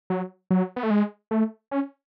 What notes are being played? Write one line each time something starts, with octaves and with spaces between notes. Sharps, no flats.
F#3
F#3
B3
A3
G#3
A3
C#4